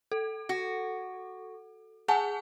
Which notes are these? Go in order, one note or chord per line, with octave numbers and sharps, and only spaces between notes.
A4
F#4
G#4 F#5 G#5 A5